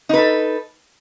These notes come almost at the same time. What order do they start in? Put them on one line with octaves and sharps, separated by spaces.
D#4 B4 A4